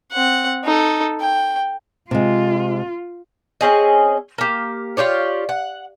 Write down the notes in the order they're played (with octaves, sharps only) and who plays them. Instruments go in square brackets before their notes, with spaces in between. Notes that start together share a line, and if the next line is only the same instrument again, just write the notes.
[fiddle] C4 F#5
D#4 A4
G5
[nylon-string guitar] C3 G#3 [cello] F4
[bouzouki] C4 C#4 G#4 D#5
A#3 G4
F4 G4 C#5 D5
F#5